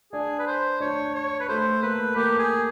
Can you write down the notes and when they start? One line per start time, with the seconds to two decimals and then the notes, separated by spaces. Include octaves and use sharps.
0.12 D4 G#4 D5
0.39 B4
0.47 C5
0.80 D4 C#5 D5
1.15 C#5
1.40 B4
1.48 A3 A4 C5
1.82 A#3 A#4 B4
2.16 A#3 G4 A#4
2.39 G#4